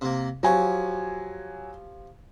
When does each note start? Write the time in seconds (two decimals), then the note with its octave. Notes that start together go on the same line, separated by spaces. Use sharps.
0.01 C3 A#3
0.43 F3 F#3 G4 G#5 C#6